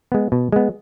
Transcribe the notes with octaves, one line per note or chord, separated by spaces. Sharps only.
G#3 B3
B2
G#3 B3